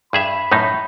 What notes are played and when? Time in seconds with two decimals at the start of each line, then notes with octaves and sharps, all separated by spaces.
0.13 G2 G#4 E5 B5
0.52 F#2 A2 D#4